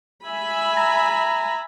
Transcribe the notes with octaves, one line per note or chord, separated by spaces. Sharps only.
E5 G#5 B5
A#5